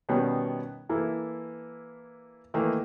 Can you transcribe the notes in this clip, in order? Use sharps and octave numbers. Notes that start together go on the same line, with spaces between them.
B2 D#3 G3 B3 C#4
E3 A#3 E4 A4
D#3 E3 A3 A#3